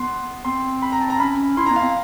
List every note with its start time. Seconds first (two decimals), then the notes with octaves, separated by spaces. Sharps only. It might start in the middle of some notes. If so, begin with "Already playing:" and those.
Already playing: B3 C6
0.45 C4 C6
0.82 B5
0.92 A#5
1.01 A5
1.10 A#5
1.19 C#4 B5
1.57 E4 C6
1.66 B3 A#5
1.76 F5
1.81 C4